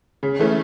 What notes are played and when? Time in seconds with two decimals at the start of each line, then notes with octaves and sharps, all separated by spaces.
0.23 C#3
0.39 E3 A3 C#4